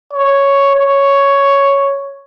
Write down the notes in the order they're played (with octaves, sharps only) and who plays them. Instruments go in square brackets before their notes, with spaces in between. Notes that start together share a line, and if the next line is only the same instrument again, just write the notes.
[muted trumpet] C#5
C#5